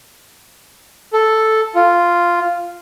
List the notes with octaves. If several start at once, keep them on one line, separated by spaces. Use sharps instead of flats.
A4
F4